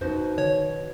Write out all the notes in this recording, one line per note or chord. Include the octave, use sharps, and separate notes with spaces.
F#2 B2 D#4 F#4 C5
D#3 C#5